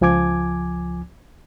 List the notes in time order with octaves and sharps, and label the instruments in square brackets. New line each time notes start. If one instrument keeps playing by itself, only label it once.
[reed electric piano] C#2 F3 G#5 D6 G#6